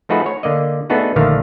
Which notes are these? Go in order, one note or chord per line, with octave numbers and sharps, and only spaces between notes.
F3 A3 D#4 F#4 G#4 B4
C#5
D3 A#3 D5 D#5
A3 B3 D4 D#4 F#4 G#4
A#1 D3 D#3 A3 F5